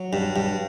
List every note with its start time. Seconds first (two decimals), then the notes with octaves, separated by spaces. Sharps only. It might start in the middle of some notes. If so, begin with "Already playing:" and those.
Already playing: F#3
0.13 G2
0.36 G2